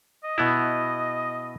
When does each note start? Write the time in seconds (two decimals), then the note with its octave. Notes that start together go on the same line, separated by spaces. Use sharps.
0.24 D#5
0.38 B2 B3 E4